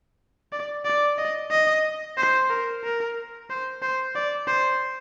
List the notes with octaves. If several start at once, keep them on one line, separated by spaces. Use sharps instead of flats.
D5
D5
D#5
D#5
C5
A#4
A#4
C5
C5
D5
C5